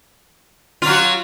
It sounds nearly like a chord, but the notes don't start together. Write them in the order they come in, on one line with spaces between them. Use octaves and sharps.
F4 F#3 F#4